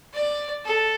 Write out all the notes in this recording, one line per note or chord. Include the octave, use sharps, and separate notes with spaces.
D5
A4